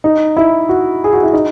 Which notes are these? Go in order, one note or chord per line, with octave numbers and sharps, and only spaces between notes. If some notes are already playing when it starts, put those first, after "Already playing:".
D#4
E4
F#4
G#4
F#4
E4
D#4